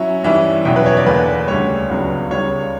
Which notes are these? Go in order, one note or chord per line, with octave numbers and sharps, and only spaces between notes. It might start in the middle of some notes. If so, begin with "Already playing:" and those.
Already playing: F#3 C#4 E4 E5
G2 E3 G3 C#4 E4 E5
E2 B2 F#3 C#4 E4 G5
B4
C#5
D5
E2 D3 A#3 D4 B4
D2 C#3 G3 C#5
C#2 C#3 F#3 B3 D4
C#2 C#3 G3 C#5